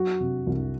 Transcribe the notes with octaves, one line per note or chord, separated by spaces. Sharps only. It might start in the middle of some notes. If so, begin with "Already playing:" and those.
Already playing: F#3 F#4
C3
C2